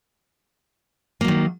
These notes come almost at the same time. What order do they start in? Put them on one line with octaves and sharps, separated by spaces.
A#3 F#3 D#3